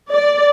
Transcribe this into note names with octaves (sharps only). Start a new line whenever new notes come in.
D5